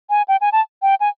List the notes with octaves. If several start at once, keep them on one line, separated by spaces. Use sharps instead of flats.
G#5
G5
G#5
A5
G5
G#5